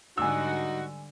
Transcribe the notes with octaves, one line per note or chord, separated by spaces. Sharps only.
G#2 D3 G3 D#4 F#4 G#5 E6